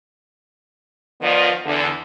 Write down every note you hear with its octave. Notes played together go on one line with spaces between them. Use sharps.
D#3 F3 B3 F4 D5
E2 D3